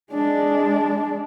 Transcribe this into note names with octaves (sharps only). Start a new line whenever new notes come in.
G#3 D4